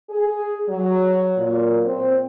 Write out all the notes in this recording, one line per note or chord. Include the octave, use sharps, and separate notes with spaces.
G#4
F#3
A#2
C4